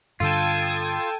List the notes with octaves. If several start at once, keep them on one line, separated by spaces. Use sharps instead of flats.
G2 D3 F4 A4 G5 A5 D#6 G#6